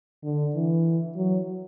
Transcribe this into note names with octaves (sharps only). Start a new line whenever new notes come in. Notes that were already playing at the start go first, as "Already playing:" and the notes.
D3
E3
F#3